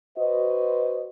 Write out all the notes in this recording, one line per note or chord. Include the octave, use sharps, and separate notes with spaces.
F#4 B4 C5 D#5